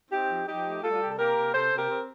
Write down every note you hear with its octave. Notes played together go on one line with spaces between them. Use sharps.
C4 D#4 G4
F3
F3 D#4 G4
A3
G3 F4 A4
F4
C3 G4
A4
A#3 G4 A#4
C3
C3 A4 C5
C3
G4 A#4
C4